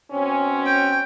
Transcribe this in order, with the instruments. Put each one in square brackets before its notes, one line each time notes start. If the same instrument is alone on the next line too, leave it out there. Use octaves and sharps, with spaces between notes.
[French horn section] B2 C4 C#4
[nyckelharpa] G5